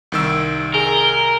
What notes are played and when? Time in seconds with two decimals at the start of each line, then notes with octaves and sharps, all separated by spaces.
0.12 C2 D#3 E6
0.74 G#4 A#4 G7